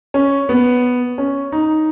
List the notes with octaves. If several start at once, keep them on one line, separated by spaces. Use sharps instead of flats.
C#4
B3
C#4
D#4